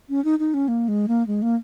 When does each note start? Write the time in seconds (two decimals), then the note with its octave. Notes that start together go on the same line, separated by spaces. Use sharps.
0.09 C#4
0.24 D#4
0.39 D#4
0.54 C#4
0.68 A#3
0.88 G#3
1.08 A#3
1.27 G#3
1.42 A#3